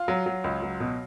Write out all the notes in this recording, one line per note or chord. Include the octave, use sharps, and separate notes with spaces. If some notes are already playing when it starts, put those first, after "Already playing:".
Already playing: F4
F#3
F#3
C#2
F#3
B2